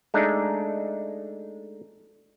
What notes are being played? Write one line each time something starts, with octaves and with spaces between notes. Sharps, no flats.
G#3 A3 D4 D#4